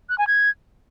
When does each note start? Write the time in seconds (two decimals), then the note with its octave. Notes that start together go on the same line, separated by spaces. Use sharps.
0.09 F#6
0.18 G#5
0.27 G#6